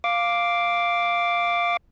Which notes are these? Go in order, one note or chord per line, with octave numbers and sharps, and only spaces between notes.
F5 D6